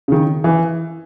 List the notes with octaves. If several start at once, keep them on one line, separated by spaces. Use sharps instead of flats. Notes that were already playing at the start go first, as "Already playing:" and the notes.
C#3
D#3
E3